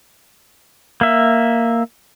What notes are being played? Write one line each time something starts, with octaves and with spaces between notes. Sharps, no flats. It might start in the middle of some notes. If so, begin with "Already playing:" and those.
A#3 E5